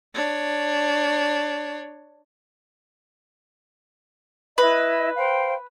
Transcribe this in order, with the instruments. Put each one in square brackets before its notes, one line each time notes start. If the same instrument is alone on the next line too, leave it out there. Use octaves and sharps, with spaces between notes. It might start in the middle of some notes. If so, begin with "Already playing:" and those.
[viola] D4 C#5
[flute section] E4 D#5 [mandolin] B4
[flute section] C5 F5 G5